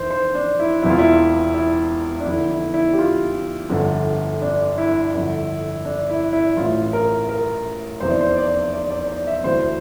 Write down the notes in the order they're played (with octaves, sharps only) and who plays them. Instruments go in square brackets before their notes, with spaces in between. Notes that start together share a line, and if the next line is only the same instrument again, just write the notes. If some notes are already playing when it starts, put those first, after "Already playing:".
Already playing: [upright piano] F1 F2 E3 C5
C5
D4
E4
E1 E2 C3 E3 E4
F4
E4
E4
D4
F1 E2 D3 E4
E4
E4
G4
F4
G1 F2 D3
D4
E4
G1 F2 D3
D4
E4
E4
A1 A2 E3 F4
A#4
A#4
F1 E2 C3 E3 C5
D5
C5
D5
D5
D5
D5
E5
D2 C3 E3 C5